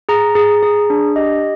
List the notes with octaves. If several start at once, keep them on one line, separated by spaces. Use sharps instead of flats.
G#4 A#5
G#4
G#4
D4
G4 D#5